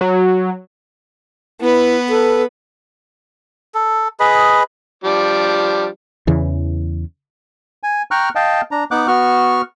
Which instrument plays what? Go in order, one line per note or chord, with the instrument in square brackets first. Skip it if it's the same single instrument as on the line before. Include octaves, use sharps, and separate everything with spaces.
[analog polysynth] F#3
[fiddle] B3 B4 [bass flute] E4
[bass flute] A4
[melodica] A4
G#4 B4 D#5 B5
[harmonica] F3 G3 D4
[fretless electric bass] E2 C#3 E3
[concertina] G#5
G5 A#5 C#6 F6 F#6
D#5 F5 G5 A5
D4 A#5
B3 D#4 F#5 D6 F#6
B3 F#4 C#6 F6